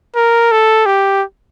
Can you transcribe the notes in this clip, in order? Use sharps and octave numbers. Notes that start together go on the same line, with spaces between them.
A#4
A4
G4